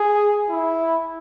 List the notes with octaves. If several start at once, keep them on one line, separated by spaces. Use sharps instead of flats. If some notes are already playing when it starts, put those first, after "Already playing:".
Already playing: G#4
E4